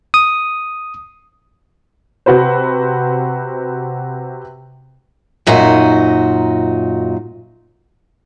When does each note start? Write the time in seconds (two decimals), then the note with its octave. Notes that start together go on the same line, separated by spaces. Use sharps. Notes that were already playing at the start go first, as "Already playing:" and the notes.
0.14 D#6
2.26 C3 F#4 B4 C5
5.46 F#2 A#2 D#4 F#4